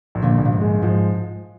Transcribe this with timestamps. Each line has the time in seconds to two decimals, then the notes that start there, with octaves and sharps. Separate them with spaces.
0.15 A#1
0.22 A#2 D3
0.38 A#1
0.45 A#2
0.52 G#2
0.60 G#3
0.82 G#2 F3